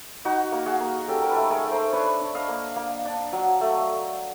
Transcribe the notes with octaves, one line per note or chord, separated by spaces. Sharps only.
D#4 F#4
A#3
F#4 G#4
A#3
C#4 G4 A4
A#4
A4 B4
A3
G#4 A#4
A3
A#4 C5
D4 B4 C#5
D4
D#5 F5
A#3
A#3
D4
F#3
A3